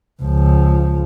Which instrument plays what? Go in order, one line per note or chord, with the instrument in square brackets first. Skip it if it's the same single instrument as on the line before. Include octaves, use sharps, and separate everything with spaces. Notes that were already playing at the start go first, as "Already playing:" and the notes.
[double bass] C#2 F3